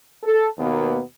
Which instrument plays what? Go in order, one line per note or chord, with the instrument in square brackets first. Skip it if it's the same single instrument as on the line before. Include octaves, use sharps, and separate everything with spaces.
[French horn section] A4
D#2 B2 A#3 B3